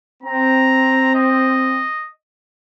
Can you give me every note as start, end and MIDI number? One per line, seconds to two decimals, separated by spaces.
0.23 1.85 60
0.23 1.13 82
1.15 2.10 75